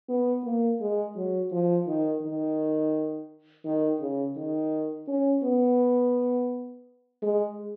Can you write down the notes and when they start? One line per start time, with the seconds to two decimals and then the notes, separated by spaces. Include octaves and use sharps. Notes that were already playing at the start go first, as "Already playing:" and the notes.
0.09 B3
0.44 A#3
0.80 G#3
1.16 F#3
1.52 F3
1.87 D#3
2.22 D#3
3.65 D#3
4.01 C#3
4.37 D#3
5.08 C#4
5.44 B3
7.22 G#3